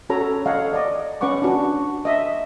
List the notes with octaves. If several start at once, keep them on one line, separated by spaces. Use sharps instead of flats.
C#4 F#4 A4 C#5 A#5 B5
A4 C#5 D#5 F5 F#5
D5 D#5 A#5
C#4 B4 F#5 C#6 D6
D4 F#4
D#5 E5